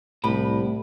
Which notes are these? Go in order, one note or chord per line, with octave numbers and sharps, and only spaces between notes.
C2 A2 B5